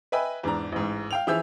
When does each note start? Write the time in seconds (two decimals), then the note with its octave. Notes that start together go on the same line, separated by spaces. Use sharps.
0.12 B4 D#5 E5 G5 G#5 B5
0.43 E2 G#2 D4 A#5
0.72 A1 G#2
1.11 F5 G5 F7
1.27 E3 F3 G#4 E5 E6 G6